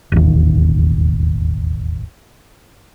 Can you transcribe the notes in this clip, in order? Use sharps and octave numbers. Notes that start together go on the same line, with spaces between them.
E1 A1 D#2